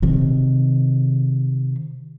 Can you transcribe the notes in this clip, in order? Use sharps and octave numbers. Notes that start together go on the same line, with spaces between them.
C3 D#3